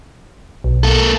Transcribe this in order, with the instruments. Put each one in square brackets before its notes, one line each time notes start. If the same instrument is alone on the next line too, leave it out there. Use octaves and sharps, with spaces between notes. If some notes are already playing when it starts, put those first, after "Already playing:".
[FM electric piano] B1
[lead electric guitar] A#3 A4